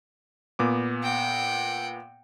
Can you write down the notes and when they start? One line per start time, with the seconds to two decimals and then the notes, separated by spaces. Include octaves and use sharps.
0.59 A#2 B3 D6
1.03 F#5 G5